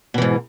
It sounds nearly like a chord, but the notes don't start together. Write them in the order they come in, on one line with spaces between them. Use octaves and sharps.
B2 E3 G#2